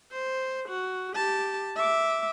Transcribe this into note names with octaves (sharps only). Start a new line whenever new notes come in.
C5
F#4
G4 A5
E5 D6